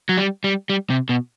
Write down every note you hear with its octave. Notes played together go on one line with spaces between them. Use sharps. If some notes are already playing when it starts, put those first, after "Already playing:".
F#3
G3
G3
G3
C3
B2